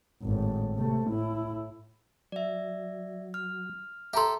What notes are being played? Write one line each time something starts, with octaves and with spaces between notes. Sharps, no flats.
G#1 A2
C3 A3
A2 E4
F#3 D5 E5
F6
G4 A4 E5 A#5 C6